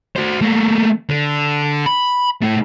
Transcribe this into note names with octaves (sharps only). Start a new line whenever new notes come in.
F#4 C5
A3 A#3
D3
B5
A3 E4